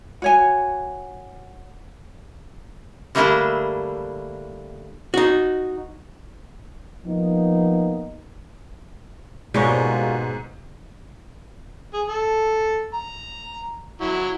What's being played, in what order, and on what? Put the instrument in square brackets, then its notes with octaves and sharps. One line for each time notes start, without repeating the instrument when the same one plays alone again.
[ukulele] F#4 C#5 G#5
[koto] D3 G3 A3 A#3 D4 E4
[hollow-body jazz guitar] D#4 F#4
[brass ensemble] F3 A#3 B3 D#4
[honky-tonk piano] G#2 [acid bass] B2 [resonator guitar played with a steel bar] G3 G#3 C#5 [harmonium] A#3 F4 F#4
[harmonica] G#4
A4
A#5
F#3 E4